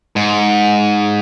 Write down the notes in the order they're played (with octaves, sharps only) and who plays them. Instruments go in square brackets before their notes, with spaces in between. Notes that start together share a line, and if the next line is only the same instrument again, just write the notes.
[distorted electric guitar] G#2